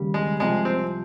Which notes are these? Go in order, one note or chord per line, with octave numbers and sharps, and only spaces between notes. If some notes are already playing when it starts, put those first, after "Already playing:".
Already playing: D#2 C#3 G3
G#3
C2 C3 F3 G#3
C4